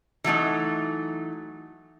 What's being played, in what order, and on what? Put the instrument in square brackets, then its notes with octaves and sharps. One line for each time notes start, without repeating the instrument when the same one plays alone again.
[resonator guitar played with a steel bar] E3 F#3 A3 D#4